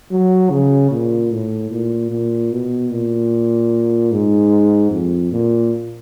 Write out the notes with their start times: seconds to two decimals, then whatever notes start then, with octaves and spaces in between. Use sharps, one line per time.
0.11 F#3
0.50 C#3
0.91 A#2
1.32 A2
1.71 A#2
2.11 A#2
2.52 B2
2.91 A#2
4.12 G#2
4.91 F2
5.32 A#2